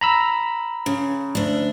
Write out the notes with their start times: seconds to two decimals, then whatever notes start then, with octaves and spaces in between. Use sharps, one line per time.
0.01 A#5 B5 E6
0.86 C#3
1.35 D2 D4